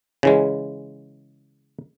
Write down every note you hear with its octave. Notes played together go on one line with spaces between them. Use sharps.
C#3 E3 G#3